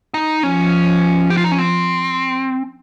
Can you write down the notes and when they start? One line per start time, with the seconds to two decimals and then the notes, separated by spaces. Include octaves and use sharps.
0.14 D#4
0.43 F3 C#4
1.30 G4
1.37 F4
1.44 D#4
1.51 C#4
1.58 C4